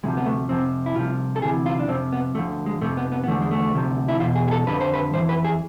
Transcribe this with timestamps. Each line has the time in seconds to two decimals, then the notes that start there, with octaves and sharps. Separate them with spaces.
0.03 D2 C3 F3 G#3
0.17 B3
0.26 A3
0.49 F2 C3 F3 C4
0.86 E4
0.96 C2 C3 F3 F4
1.36 A4
1.42 D2 C3 E3 G#4
1.66 F4
1.80 D4
1.88 F2 C3 F3 C4
2.12 B3
2.35 D2 D3 F3 A3
2.66 G#3
2.81 F2 C3 F3 A3
2.97 B3
3.12 B3
3.24 B3
3.28 E2 D3 F3 A3
3.41 G#3
3.51 A3
3.74 D2 C3 F3
4.08 E4
4.20 E2 B2 F4
4.35 G#4
4.48 G#4
4.51 A4
4.67 F2 D3 F3 B4
4.81 C5
4.94 B4
5.13 F2 C3 E3 C5
5.29 B4
5.44 G#4